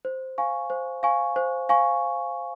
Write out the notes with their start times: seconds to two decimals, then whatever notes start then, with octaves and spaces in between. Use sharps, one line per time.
0.05 C5
0.38 F5 G#5 C#6
0.70 C5
1.03 F5 G#5 C#6
1.36 C5
1.69 F5 G#5 C#6